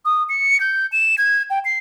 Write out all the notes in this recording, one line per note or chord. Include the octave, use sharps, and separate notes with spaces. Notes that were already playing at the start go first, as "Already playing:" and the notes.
D#6
C#7
G6
E7
G#6
G5
C7